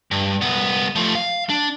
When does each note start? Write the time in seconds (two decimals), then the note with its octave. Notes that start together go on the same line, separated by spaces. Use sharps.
0.11 G2
0.41 C2 B3
0.96 F3 A3
1.15 F5
1.49 D4